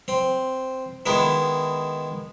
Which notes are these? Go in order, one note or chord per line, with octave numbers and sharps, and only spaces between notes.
C4
D#3 G#3 B3 E4